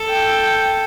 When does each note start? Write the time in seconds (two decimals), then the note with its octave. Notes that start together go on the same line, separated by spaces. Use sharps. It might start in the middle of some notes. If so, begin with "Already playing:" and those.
Already playing: A4
0.09 G5